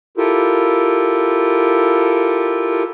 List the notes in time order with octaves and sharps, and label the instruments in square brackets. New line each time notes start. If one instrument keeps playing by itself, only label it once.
[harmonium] E4 F4 G4 A4 A#4